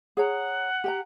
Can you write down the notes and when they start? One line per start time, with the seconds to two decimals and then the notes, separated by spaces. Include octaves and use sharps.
0.17 G#4 C#5 F#5 A#5
0.84 G4 G5 A#5